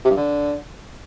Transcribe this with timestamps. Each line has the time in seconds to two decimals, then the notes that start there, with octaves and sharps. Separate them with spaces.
0.05 C3
0.11 G2
0.17 D3